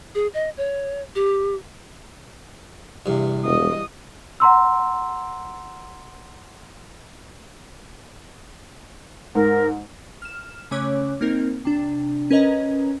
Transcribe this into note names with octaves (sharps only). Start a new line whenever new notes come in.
G#4
D#5
C#5
G4
E2 G2 C3
E1 D#5 D#6
F#5 A#5 C6 E6
G#2 A#4
F6 E7
C#3 A3 C#4 C#5 D6 F#6
A#3 C4 D#4 A#4
C3 D4
C#4 A#4 B4 D#5 A#5